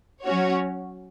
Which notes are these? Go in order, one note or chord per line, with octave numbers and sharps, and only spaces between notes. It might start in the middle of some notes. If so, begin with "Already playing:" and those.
F#3 C#4 F#4 C#5